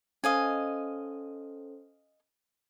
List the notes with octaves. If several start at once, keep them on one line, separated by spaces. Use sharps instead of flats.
C#4 A4 C5 D#5 F5 G#5